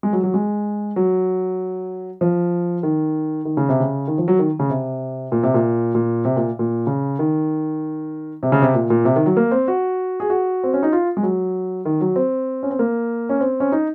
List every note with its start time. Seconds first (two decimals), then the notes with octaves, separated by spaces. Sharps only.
0.03 G#3
0.13 F#3
0.24 F#3
0.34 G#3
0.96 F#3
2.21 F3
2.83 D#3
3.45 D#3
3.57 C#3
3.69 C3
3.80 C#3
4.08 D#3
4.18 F3
4.28 F#3
4.39 D#3
4.60 C#3
4.70 C3
5.32 A#2
5.43 C3
5.54 A#2
5.95 A#2
6.25 C3
6.36 A#2
6.59 A#2
6.87 C#3
7.19 D#3
8.43 C3
8.52 C#3
8.62 C3
8.74 A#2
8.90 A#2
9.05 C3
9.16 D#3
9.26 F#3
9.37 A#3
9.52 C4
9.68 F#4
10.20 G#4
10.30 F#4
10.64 C4
10.74 C#4
10.83 D#4
10.92 F4
11.17 G#3
11.23 F#3
11.85 D#3
12.01 F#3
12.16 C4
12.63 C#4
12.71 C4
12.79 A#3
13.29 C#4
13.41 C4
13.60 C#4
13.72 D#4